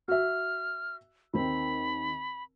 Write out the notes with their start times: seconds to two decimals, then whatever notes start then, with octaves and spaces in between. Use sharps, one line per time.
0.08 F#4 E5 F6
1.34 D#2 D#3 C4 B5